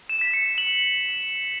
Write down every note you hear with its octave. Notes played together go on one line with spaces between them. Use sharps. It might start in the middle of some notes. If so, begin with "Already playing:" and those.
E7
B6
C#7
E7
F#7